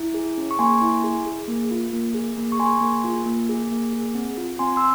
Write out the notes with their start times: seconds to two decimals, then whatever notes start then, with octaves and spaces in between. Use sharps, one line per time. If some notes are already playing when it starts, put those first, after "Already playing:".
Already playing: E4
0.14 G#4
0.38 C#4
0.51 C#6
0.59 A#3 G#5 C6
0.81 E4
1.04 G#4
1.26 G#4
1.48 A#3
1.71 F4
1.93 A#3
2.14 G#4
2.37 A#3
2.52 C#6
2.59 G#4 G#5 C6
2.81 A#3
3.04 F4
3.26 A#3
3.49 G#4
3.71 A#3
3.93 G#4
4.15 C4
4.38 F4
4.59 C4 G#5 C6
4.76 C6 E6